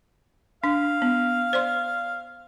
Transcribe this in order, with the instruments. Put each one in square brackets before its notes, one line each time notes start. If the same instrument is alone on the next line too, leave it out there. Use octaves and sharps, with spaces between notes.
[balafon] D4 [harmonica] F5
[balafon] B3
C5 D5 C6